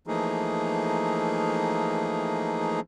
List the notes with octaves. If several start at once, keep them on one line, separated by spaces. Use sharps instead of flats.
E3 F3 A3 A#3 D#4 G#4